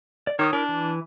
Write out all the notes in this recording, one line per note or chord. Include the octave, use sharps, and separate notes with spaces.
D5
D#3 C#5 D6 D#6
D4 E4 A#4
E3